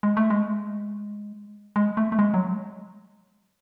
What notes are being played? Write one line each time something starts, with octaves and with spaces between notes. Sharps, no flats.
G#3
A3
G#3
G#3
A3
A3
G#3
F#3